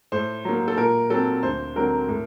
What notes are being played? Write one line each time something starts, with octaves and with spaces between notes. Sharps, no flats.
A2 C5
F#3 A#3
A4
A#2 A#4
F#3 C4 A4
D2 C5
D3 F#3 C4 A#4
A2